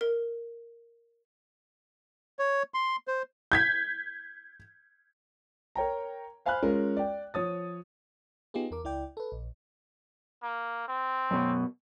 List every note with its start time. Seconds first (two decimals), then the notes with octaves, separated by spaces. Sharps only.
0.01 A#4
2.39 C#5
2.74 C6
3.08 C5
3.52 G6 G#6 B6
5.75 A#4 C#5 G5 A#5
6.46 C5 F5 G#5 B5 F6 F#6
6.62 G#3 C#4 F4 A#4
6.97 D5 G5
7.34 F3 C#5 D#6 A6
8.54 B3 D#4 F4 G4 G#4
8.71 E2 A#4 D6
8.84 C#2 E4 D5 G5
9.17 A4 B4
9.32 A#1
10.43 A#3
10.88 C4
11.31 F#2 B2